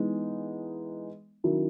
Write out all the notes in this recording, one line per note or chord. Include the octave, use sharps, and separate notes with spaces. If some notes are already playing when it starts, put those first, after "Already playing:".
Already playing: E3 G#3 B3 D#4
D#3 F#3 C#4 E4